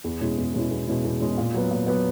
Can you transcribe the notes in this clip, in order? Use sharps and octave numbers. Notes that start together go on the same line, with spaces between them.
E2
B2 G#3 C#4 E4
E2
B2 G#3 C#4 E4
E2
B2 G#3 C#4 E4
E2
B2 G#3 C#4 E4
A#2
F#3 B3
A#2
F#3 B3